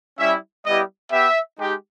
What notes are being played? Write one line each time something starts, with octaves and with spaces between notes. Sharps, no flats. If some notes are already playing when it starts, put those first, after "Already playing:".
G3 C#4 E4 E5
G3 B3 E4 G4 D#5
B3 G4 E5
G#3 D#4 G4